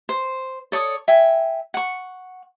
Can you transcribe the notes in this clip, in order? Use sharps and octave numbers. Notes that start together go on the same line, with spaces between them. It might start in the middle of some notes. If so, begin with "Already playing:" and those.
C5
A4 C#5 D5 D#6
E5 G5 G#5
F#5 C#6